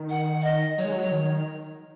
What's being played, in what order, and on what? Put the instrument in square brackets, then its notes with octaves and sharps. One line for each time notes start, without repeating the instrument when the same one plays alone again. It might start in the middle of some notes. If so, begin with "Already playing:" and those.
Already playing: [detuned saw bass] D#3
[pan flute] F#5
F#5
D#5
[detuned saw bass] F#3 [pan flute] C#5
[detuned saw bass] G#3
F#3
D#3